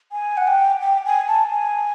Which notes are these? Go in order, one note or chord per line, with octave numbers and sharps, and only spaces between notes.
G#5
F#5
G5
G5
G#5
A5
G#5